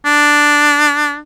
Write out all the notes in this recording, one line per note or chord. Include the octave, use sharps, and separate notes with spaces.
D4